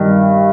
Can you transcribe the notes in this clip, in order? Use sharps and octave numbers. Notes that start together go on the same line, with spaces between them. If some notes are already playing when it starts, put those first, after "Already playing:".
Already playing: G2 D#3